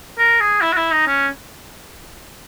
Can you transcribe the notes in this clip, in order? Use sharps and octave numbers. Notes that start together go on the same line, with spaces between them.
A#4
G#4
E4
F#4
E4
D#4
C#4